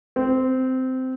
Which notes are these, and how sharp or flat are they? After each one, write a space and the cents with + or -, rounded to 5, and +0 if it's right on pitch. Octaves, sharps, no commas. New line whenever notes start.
C4 -15